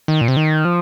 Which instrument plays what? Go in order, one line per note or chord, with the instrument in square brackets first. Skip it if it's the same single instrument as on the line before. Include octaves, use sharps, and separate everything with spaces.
[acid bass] D#3
A#2
C3
D#3
F3